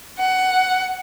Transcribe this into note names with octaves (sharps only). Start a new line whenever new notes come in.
F#5